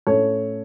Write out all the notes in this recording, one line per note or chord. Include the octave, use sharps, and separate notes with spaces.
A2 A3 C#4 A4 C#5